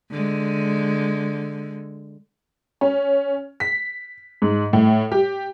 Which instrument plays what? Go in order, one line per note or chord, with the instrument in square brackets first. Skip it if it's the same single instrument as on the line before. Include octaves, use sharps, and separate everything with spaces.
[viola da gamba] D3 G#3
[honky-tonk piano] C#4
B6
G#2
A2
G4